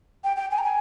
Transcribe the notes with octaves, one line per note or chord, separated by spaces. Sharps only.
G5
G5
G#5
A#5
G#5